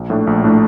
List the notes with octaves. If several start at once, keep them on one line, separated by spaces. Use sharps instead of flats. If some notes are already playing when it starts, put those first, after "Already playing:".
Already playing: A#1
A2 A3 D4
A#1
A2 A3 D4